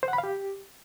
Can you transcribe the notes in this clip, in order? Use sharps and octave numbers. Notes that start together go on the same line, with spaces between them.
C5
F#5
B5
F5
G4